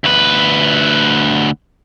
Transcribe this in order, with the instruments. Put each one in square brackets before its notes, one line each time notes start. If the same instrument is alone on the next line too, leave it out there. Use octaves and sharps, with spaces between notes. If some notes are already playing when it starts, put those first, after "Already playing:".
[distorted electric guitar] D2 B4